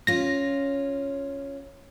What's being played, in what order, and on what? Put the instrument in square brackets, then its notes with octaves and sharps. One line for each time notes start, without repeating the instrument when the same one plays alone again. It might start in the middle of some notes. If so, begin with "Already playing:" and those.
[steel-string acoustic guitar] C#4 F4 [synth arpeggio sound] A#6